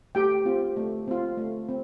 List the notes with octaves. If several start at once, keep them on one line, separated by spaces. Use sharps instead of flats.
A3 G4 G5
C4 F4
A3
C4 F4
A3
C4